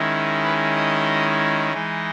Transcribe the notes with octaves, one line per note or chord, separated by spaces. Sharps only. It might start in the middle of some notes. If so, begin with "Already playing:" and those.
Already playing: D#3 G#3 C#4 E4
B4
D#5
E3 G#3 D#4